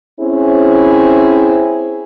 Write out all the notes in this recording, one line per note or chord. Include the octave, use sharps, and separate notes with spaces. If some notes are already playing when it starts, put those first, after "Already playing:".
C4 C#4 E4 G#4 C5